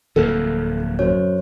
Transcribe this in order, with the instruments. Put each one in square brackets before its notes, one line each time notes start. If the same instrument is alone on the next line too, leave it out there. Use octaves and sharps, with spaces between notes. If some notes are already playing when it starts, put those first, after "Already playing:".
[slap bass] D1 F2 A#3 [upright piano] A4
[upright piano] F#2 [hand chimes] C5 C#5